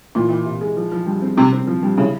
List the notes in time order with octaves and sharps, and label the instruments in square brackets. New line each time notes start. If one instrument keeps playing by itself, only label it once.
[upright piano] A#2 [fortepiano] E3
[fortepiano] E3
C3
G#3
F3
F3
G2
C4
[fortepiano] G2 [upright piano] C3
[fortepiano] C4
F3
G2
[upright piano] C#3 [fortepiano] E4